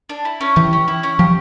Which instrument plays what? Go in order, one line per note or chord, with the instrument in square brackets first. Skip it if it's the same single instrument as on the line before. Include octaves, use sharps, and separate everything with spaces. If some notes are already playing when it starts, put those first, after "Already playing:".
[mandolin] D4
E4
C#4
[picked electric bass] E3 [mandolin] G4
[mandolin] C#4
E4
C#4
[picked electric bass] F3 [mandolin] G4